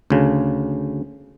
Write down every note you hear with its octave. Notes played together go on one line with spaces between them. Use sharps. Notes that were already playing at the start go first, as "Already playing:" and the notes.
D2 C#3